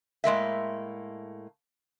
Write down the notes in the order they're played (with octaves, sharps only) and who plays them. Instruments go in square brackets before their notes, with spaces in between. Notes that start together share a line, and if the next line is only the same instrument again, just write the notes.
[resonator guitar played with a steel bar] A2 G#3 A#3 E5